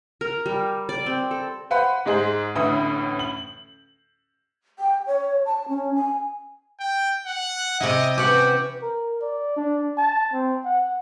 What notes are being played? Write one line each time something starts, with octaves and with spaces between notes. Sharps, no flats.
A#4
G3
D5
C4
A4
B4 C5 F#5 B5
G#2 G#3 G#4 C5 F#7
A1 D2 A2 E4 B4 D#6
F#7
G5
C#5
A5
C#4
G#5
G5
F#5
C3 E4 D#5
E3 C#4 F#4 G4 F#5
A#4
D5
D4
A5
C4
F#5